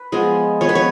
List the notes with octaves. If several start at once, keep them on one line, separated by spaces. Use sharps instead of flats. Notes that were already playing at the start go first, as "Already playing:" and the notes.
Already playing: B4
F3 G#3 B3
F3 B3 C#5
B4
C#5